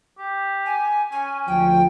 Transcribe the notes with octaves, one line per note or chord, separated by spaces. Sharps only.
G4
G#5
C#4 G#5
D2 F3 G5